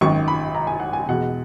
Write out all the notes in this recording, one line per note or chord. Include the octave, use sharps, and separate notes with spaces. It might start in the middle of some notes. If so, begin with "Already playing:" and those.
G#1 F#2 D#3 C#6
B5
A#5
G#5
F#5
G#5
E2 B2 G#3 F#5